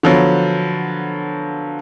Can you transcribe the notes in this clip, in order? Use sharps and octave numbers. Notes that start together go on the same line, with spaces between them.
D3 F3 F#3 B3